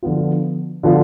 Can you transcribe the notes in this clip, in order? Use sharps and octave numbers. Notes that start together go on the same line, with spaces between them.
D3 F3 B3 F4
D3 F3 B3 F4